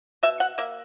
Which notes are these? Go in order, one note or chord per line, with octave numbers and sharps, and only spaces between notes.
B2 E5
F#5
A#3 E5